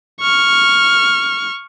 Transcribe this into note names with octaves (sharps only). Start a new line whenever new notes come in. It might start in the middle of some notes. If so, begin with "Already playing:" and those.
C#6 F6